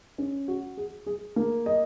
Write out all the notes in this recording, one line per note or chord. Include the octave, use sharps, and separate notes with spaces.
C#4
F#4
G#4
G#4
A#3
D#5